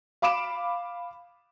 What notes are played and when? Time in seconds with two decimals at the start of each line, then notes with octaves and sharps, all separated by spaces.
0.22 F5 B5 D6 D7 E7